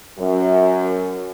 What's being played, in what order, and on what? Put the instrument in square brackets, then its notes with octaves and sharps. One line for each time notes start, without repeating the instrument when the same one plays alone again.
[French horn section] F#2